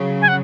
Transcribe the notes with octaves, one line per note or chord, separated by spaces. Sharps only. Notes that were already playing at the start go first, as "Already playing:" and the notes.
Already playing: C#3 F#3
G#5
F#5